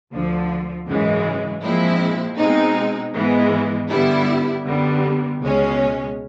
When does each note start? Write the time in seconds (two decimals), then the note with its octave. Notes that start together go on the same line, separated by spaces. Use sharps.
0.11 D2 D3 F3
0.87 G#1 F#2 C#3 E3 G#3
1.62 A#2 F3 G#3 C4 E4
2.38 B2 G#3 C4 D#4
3.14 G#2 E3 G#3 B3
3.90 G2 D3 G3 B3 E4
4.65 F#2 D3 G3 B3
5.41 C#2 B2 G#3 C#4